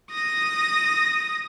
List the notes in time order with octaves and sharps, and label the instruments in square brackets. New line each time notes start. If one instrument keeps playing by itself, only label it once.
[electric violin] D#6 A#6